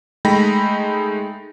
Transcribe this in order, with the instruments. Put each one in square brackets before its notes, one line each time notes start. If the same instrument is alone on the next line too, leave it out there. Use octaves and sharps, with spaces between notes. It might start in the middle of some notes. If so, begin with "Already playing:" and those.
[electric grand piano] G#3 A3 D#4 G5 B5 A#6